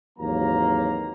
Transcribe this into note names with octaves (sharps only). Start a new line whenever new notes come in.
G#1 D#2 E3 F#3 A#3 A#5